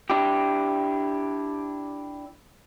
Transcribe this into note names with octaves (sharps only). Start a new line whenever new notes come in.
D4 E4 G4